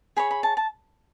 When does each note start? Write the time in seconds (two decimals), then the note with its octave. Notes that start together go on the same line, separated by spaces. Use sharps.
0.17 G#4 C#5 B5
0.31 B5
0.43 A5
0.57 A5